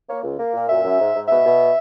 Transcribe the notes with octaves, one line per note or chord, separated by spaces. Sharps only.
A#3 C#5
C#2
A#3
A#2
F#2 E5
F#2
G#2
G#2
B2 E5
B2